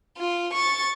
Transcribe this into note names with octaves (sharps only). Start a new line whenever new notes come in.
F4
C#6 A6